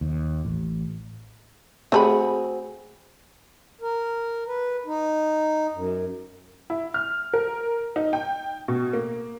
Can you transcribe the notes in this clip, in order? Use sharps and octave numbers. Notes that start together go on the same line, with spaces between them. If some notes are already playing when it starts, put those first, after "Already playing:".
D#2
A1
A3 C4 F#4 G#4 A#4 B5
A#4
B4
D#4
F#2
E4
F6
A#4
D#4
G5
B2
A#3